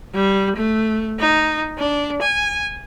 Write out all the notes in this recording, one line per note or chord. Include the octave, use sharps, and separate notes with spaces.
G3
A3
D#4
D4
G#5